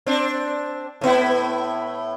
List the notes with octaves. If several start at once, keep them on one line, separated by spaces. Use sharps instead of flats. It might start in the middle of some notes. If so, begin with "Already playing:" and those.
C4 D4
A2 B3 E4